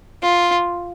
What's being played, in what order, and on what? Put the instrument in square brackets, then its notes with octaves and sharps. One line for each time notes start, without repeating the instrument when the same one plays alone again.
[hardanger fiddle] F4